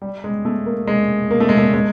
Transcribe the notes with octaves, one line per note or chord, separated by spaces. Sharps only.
G3
G#3
A3
A#3
G#3
A#3
A3
G#3
A3
G#3